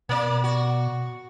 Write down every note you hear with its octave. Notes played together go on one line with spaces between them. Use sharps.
B2 A#3 D5
F#4